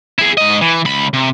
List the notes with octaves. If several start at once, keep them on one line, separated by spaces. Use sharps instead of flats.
E4 G#4
G#2 D#5
E3
C#2 B5
C3